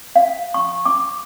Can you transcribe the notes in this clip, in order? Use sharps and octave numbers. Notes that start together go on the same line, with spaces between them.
F5
C#6
D6